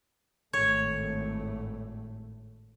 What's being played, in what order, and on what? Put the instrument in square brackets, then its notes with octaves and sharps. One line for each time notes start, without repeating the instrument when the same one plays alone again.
[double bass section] G#1 A2 A3 [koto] C#5